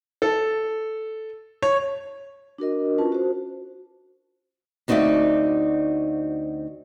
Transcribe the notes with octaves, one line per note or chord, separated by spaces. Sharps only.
A4
C#5
D4 F#4 A#4 D#5
C#4 F4 B4 A5
F#4 C5
D2 C4 D#4 F#4 D5 E5